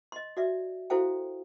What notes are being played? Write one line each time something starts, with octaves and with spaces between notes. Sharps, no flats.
D#5 C6
F#4 D5 E5
E4 F#4 A4 C5 F5 G5